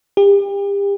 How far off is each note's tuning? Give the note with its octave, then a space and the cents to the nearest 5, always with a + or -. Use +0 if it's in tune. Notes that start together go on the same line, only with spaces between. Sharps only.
G4 +35